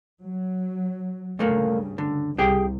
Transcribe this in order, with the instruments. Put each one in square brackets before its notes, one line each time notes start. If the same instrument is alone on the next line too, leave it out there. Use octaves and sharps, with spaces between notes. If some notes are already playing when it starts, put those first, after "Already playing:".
[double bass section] F#3
[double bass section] D2 G2 C#3 [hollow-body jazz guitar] A#2 A3 A#3
[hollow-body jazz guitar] D3
[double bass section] C2 [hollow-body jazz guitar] G4 G#4 G5